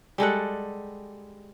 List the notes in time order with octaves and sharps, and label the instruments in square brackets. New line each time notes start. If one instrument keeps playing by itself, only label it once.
[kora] G3 G#3 A4 F#5